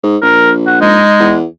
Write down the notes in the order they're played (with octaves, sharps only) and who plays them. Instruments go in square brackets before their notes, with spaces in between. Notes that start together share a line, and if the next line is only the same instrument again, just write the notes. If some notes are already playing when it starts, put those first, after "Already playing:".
[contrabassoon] G#2
[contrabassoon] A#1 [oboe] A#4
[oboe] F#5
[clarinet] G#3 [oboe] D#4
[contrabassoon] E2